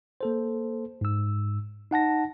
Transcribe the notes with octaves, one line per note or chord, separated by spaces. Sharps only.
A#3 A4 C5
G#2 E6
D#4 F#5 A5 A#6